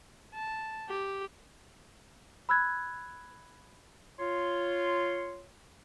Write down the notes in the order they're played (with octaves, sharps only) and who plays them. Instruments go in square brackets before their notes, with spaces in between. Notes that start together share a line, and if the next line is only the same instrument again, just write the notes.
[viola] A5
G4
[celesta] B5 E6 F#6 G#6
[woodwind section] F4 C#5 C6